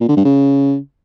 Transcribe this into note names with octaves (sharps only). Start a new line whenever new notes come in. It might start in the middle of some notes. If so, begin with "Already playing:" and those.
A#2
D3
G2
C#3